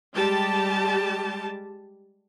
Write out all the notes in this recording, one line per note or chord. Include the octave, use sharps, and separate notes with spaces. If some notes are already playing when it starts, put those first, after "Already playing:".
G3 G#3 G4 A5